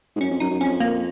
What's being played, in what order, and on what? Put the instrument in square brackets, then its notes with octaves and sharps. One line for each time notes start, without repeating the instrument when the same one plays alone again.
[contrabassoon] G#2
[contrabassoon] F#2 [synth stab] C#4
[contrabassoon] F2
[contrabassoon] F#2 [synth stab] D#4
[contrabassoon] F#2
[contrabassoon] F2 [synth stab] C#4
[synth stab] A#3